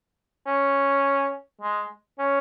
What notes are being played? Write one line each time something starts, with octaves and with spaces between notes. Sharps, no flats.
C#4
G#3
C#4